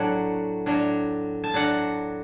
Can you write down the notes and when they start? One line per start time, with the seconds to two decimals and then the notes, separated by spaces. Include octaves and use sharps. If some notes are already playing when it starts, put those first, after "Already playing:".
Already playing: A2 F#3 D4 F#5 A5
0.66 A2 F#3 D4
1.44 A5
1.54 A2 F#3 D4 F#5